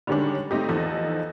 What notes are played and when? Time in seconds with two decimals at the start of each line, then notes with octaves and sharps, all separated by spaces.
0.07 D3 D#3 G3 G#3 C#4 D4
0.51 A3 C4 D#4 G4
0.69 E2 F3 D#4 A4 D#5